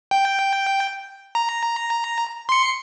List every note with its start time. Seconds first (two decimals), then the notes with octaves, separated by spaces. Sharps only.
0.11 G5
1.35 A#5
2.49 C6 C#7